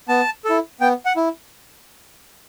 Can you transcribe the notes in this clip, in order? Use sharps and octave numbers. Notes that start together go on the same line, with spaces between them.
B3 A5
E4 A4
B3 G5
F#5
E4